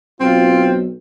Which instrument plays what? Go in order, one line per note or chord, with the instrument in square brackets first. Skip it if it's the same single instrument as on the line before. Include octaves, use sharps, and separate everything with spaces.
[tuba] B1 [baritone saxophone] C4 [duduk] F4